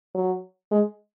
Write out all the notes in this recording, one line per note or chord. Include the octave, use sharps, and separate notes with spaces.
F#3
G#3